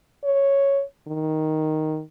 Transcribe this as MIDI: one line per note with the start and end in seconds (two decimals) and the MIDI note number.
0.24 0.82 73
1.08 2.02 51